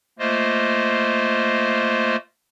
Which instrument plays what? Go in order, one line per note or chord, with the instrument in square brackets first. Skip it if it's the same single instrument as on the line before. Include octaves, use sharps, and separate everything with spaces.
[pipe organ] A3 A#3 F4 C5 D#5